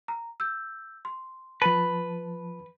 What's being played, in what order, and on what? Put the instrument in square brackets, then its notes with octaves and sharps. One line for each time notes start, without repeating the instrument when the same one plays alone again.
[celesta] A#5
E6 G6
C6
[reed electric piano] F3 A5 [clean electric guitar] B4